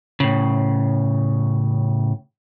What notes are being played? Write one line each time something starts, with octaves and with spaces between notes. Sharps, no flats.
A2 C#3